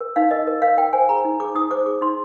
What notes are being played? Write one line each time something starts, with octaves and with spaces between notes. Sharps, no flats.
A#4
D#4 F5
A#4 D#5
A#4
A#4 F5
A#4 G5
C5 G#5
G#4 A#5
D#4
G#4 D6
D#4 D#6
C5 D6
G#4 D6
D#4 C6